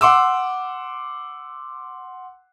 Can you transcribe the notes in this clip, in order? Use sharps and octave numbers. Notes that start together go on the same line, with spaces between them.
F#5 C6 D6 E6